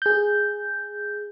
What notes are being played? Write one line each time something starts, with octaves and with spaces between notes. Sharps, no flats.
G#4 G6